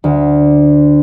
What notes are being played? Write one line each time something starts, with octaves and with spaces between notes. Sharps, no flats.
D2